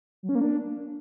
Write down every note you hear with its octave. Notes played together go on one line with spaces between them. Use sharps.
F#3
C#4
A#3
D4